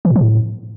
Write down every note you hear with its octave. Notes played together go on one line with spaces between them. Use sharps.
E3
A#2
F3
A2